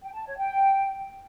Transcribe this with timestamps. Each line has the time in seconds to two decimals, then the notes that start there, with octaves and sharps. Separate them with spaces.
0.03 G5
0.14 A5
0.26 C#5
0.38 G5